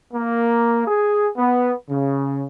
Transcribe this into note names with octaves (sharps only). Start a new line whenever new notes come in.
A#3
G#4
B3
C#3